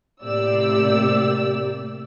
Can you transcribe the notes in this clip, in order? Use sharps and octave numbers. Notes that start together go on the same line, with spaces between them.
A2 C3 A#3 G4 D5 E6